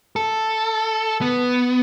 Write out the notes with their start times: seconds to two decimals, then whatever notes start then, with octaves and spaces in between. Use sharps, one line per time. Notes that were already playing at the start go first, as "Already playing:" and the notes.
0.16 A4
1.21 B3